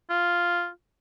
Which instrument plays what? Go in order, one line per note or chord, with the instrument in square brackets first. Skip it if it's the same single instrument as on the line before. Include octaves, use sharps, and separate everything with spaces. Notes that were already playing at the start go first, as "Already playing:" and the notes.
[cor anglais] F4